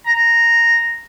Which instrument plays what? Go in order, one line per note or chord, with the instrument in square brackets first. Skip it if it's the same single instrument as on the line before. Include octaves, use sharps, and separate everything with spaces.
[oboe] A#5